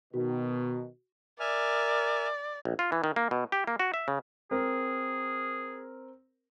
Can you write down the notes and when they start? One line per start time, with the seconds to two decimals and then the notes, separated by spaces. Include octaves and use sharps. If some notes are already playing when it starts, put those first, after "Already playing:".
0.14 B2 D#3 F#4
1.40 A#4 D5 E5 G#5 F6
2.65 A#1
2.79 F4
2.92 E3
3.04 D#3
3.16 A#3
3.31 B2
3.52 G4
3.67 A#3
3.80 F#4
3.94 E5
4.08 C#3
4.51 C4 G#4 A#4